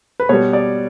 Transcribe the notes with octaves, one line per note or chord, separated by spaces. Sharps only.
B4
B2 G3 C#5
D5